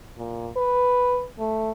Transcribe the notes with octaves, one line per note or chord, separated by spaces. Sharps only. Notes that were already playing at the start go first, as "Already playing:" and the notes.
A#2
B4
A3